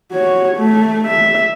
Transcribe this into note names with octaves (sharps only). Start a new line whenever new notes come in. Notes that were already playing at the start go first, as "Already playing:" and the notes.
F#4 C#5
A3
E5